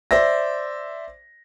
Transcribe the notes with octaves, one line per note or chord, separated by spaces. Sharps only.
C5 D5 E5 A#6